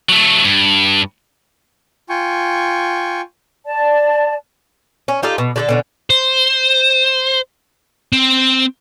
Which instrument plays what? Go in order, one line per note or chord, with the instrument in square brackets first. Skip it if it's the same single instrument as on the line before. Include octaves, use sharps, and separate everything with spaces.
[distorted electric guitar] F#3 A3
G2
[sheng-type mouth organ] F4 G5 G#5 C#6
[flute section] D5 A5
[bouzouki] C#4
D#4 F4 G4 A4
B2
D3 G4 A4
B2 D3 C#4
[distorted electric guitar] C5
C4